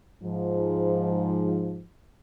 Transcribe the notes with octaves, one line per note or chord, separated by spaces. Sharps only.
G#2 F3